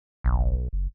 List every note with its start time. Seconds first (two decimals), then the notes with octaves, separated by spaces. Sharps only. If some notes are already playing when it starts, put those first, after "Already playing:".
0.24 F#1 B1
0.73 F#1